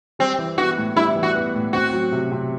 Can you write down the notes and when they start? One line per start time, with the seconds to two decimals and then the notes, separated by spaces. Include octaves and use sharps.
0.19 G3 C4
0.39 E3
0.58 B3 F#4
0.77 A2
0.96 G3 E4
1.15 E3
1.23 F#4
1.35 B3
1.55 A2
1.73 C4 F#4
1.93 F#3
2.12 C3
2.32 C3